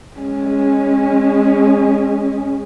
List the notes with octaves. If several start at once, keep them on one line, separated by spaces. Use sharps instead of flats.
G#3 C#4